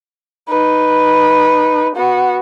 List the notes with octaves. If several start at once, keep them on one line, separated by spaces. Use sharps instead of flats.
D#4 B4
B3 F#4